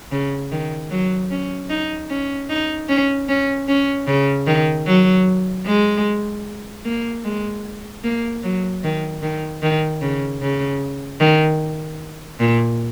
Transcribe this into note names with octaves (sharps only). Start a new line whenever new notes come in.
C#3
D#3
F#3
C#4
D#4
C#4
D#4
C#4
C#4
C#4
C#3
D#3
F#3
G#3
A#3
G#3
A#3
F#3
D#3
D#3
D#3
C#3
C#3
D#3
A#2